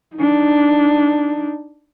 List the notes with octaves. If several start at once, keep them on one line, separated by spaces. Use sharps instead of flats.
D4 D#4